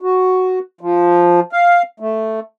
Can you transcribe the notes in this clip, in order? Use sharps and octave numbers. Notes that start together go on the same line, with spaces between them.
F#4
F3
F5
A3